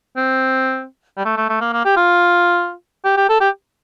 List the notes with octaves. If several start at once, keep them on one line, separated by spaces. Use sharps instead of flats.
C4
G3
A3
A3
A3
A#3
A#3
G4
F4
G4
G4
A4
G4